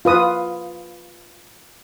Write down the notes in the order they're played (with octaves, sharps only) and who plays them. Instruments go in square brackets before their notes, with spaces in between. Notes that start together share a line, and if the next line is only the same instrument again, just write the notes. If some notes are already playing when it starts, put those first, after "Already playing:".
[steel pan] F4 B4 D#6